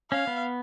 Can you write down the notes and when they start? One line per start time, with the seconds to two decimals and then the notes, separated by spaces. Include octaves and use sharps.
0.11 C#4 F5
0.27 B3